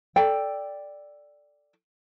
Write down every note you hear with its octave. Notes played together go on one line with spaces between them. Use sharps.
A4 D5 G5